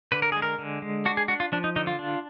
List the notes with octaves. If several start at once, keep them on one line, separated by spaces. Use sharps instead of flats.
D3 B4
A#4
G#3 G#4
A#4
D3
G#3
D4 F#4
G#4
D4 F#4
F4
F3 D4
D#4
D3 D#4
F4
D4